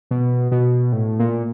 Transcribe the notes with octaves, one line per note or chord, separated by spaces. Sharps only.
B2
B2
A2
A#2